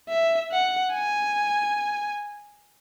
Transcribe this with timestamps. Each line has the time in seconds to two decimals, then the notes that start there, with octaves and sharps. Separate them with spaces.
0.09 E5
0.52 F#5
0.93 G#5